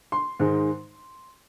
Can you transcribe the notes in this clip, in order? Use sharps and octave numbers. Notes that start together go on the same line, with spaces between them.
C6
G#2 D#3 G#3 D#4